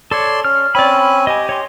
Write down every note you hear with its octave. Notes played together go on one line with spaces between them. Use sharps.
A4 C#5 D5 C6
C#4 F6
C4 C#4 D5 G#5 B5
B5
G4 D#5 G#5
C#5 D#5 C6